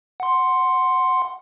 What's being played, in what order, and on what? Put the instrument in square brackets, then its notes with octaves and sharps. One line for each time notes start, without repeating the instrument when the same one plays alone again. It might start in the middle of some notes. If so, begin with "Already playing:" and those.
[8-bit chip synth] F#5 C6